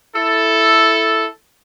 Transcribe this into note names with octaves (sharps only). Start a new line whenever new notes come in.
E4 A4